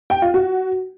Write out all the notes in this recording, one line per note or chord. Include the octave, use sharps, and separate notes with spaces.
G5
F4
F#4